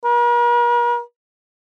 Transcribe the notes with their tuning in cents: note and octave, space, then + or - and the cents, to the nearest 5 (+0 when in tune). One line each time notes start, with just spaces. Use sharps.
A#4 +45